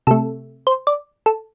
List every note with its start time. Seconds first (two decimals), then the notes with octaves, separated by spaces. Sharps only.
0.07 C3 A3 A4
0.67 C5
0.87 D5
1.26 A4